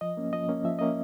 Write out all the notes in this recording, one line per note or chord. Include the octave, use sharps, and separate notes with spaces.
F3 D#5
A#3 C#4
F3 D#5
A#3 C#4
F3 E5
A#3 C#4 D#5